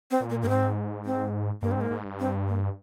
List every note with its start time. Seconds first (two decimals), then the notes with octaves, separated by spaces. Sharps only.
0.11 C4
0.21 A#2
0.30 A#3
0.42 G2 A#3
0.48 G#2 C4
1.05 C4
1.62 G2 A#3
1.71 C4
1.77 G#2 A#3
1.91 G#2
2.05 G2
2.20 C4
2.48 A#3